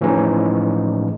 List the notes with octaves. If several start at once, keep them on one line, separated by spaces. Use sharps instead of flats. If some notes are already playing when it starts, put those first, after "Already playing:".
A2 E3 F3 G#3 C#4 D#4